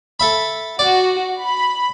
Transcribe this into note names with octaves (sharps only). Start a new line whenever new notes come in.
A4 E5 B5
F#4 D5
B5